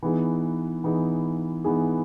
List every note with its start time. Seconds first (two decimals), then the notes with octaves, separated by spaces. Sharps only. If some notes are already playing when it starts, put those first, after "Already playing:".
0.03 E3 B3 D#4 G#4
0.84 E3 B3 D#4 G#4
1.64 E3 B3 D#4 G#4